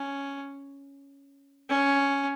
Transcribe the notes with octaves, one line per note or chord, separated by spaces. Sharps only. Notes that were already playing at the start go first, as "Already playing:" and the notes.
Already playing: C#4
C#4